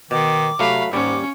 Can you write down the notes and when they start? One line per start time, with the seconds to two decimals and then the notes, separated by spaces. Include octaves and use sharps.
0.11 B2 D#3 D6
0.59 C3 F#3 A3 F#4 F5 B5
0.93 D#2 G#2 G3 C#4 D6